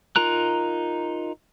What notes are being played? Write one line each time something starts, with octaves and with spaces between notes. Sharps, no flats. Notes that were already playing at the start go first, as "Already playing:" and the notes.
D#4 F4 A#4 A#5 F#6